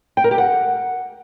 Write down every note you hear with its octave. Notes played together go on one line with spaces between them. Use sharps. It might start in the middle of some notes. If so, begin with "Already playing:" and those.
G5
A#4
G4
F#5